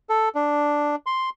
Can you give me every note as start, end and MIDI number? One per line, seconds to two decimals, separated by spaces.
0.09 0.29 69
0.35 0.96 62
1.06 1.30 84